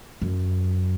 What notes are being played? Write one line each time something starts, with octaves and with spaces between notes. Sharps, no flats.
F#2